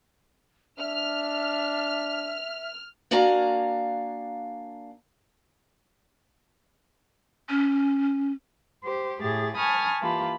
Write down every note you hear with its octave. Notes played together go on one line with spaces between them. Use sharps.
D4 E5 F6
A#3 D4 F#4 F5 G#5 A#5
C#4
G4 C5
A2 G4 G#4 A6
G#5 A5 B5 C#6 D#6 F6
E3 A#3 F4 G4 A5 B5